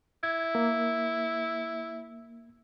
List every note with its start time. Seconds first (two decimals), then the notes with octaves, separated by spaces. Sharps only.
0.23 E4 G#6
0.55 A#3